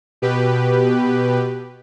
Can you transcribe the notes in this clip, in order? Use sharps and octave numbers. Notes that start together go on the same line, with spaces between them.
B2 G4 B4